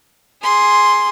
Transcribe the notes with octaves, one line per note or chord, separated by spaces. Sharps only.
G#4 C6